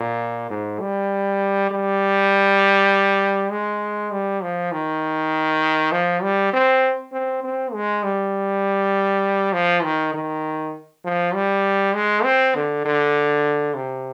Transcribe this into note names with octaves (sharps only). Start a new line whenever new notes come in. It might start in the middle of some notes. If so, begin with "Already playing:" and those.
Already playing: A#2
G#2
G3
G3
G#3
G3
F3
D#3
F3
G3
C4
C4
C4
G#3
G3
F3
D#3
D#3
F3
G3
G#3
C4
D3
D3
C3